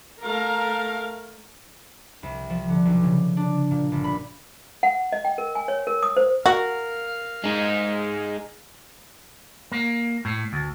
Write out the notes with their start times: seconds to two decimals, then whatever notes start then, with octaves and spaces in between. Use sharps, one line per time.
0.22 A3 A#4 F5
2.23 C2
2.50 F3
2.69 D3
2.85 B1
3.03 C#3
3.37 D4
3.71 A#2
3.92 G1
4.04 B5
4.83 F#5
5.12 D#5
5.25 G5
5.38 A#4
5.55 G#5
5.68 C#5
5.87 A#4
6.03 D#6
6.17 C5
6.46 F#4 A#4 F5
7.44 G#3 D#4
9.72 A#3
10.25 A2
10.53 D2